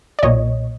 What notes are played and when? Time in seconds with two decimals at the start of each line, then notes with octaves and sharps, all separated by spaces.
0.19 D5
0.23 B1 A#2 C#5 D#5